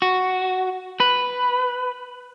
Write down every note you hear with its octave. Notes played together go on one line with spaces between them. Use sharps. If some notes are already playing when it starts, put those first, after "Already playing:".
F#4
B4